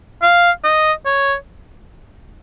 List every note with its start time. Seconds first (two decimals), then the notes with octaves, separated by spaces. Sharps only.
0.22 F5
0.64 D#5
1.05 C#5